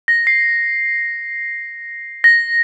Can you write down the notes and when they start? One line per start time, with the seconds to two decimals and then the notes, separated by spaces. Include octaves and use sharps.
0.08 A#6
0.27 C7
2.24 A#6